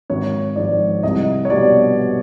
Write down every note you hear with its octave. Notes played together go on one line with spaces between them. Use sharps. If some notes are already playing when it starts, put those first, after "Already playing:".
G#1 C#5
G#2 F3 G#3 D5
C2 D#5
C#5
B2 G3 D5